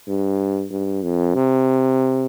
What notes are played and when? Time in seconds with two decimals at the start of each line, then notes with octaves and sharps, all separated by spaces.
0.08 G2
0.71 G2
1.03 F2
1.35 C3